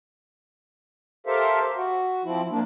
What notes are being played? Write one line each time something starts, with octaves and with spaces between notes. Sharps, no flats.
G4 A4 A#4 C5 E5 F5
F#4
F3 C4 E4
F3 A#3 D4